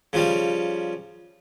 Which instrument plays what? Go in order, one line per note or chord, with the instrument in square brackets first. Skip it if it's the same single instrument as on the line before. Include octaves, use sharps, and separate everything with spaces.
[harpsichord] C#3 F3 G3